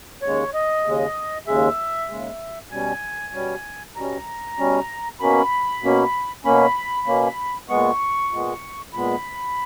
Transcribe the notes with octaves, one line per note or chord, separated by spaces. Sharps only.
D#2 C#3 G#3 C#5
D#5
D#2 C#3 G#3
D#2 C#3 G#3 E5
D#2 C#3 G#3
B2 G3 C#4 G#5
B2 G3 C#4
B2 G3 C#4 A#5
B2 G3 C#4
B2 A#3 C#4 B5
B2 A#3 C#4
B2 A#3 C#4 B5
B2 A#3 C#4
A#2 G#3 B3 C#6
A#2 G#3 B3
A#2 G#3 B3 B5